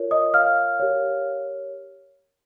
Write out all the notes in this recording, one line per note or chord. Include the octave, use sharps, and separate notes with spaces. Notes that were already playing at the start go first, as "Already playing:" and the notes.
Already playing: F4 A#4 C#5
D#5 D#6
F5 F6
G4 A#4 C#5